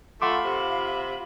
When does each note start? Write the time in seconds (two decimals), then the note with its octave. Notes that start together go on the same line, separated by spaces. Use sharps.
0.22 A3 F4 F5 F#5 B5 C6 D6
0.45 C3